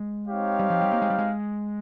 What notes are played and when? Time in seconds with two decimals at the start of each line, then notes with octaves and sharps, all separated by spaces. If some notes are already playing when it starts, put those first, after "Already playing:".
Already playing: G#3
0.26 C4 D#4 G4 C#5 F5
0.59 G3
0.70 F3
0.81 G3
0.93 A#3
1.02 G#3
1.10 G3
1.19 G#3